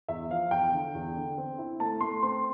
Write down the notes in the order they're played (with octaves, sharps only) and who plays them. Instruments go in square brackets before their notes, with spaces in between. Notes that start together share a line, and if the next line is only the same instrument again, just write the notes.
[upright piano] E2 E5
F3 F5
E2 G5
D3
E2
D3
C4
E4
A3 A5
A3 C6
C4 C6